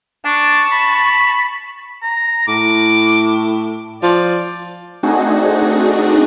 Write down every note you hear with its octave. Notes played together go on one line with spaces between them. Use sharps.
D4 A5 C#6
B5
A#5
A2 D6
F3 D5
A3 C4 D4 D#4 F#4 G#4